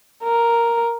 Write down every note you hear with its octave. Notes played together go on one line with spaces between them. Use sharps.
A#4